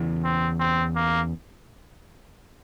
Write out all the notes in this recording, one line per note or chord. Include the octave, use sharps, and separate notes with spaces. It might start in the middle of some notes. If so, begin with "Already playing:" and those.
Already playing: E2 C#3 E3
C4
C4
A#3